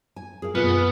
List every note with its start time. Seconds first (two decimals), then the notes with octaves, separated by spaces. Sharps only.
0.16 G#5
0.42 G#4 A#4 F5
0.55 F#2 B2 B3 F4